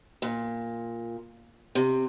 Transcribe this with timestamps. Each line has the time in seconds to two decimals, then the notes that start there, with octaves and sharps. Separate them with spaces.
0.22 A#2
1.75 C3